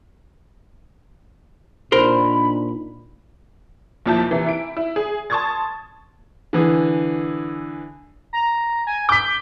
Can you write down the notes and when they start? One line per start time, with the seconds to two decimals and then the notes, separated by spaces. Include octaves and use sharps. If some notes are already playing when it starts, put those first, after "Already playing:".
1.92 A#2 D4 D#4 A#4 C5 B5
4.06 D#2 A#2 F3 E4 A5 G6
4.31 C3 E3
4.46 E4 D7
4.77 E4
4.96 G#4
5.30 A5 C6 C#6 D#6 G#6 A6
6.53 D3 E3 G#4
8.33 A#5
8.87 G#5
9.09 D6 G6 B6